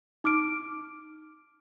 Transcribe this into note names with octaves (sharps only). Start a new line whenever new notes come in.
D#4 D6 F6 D7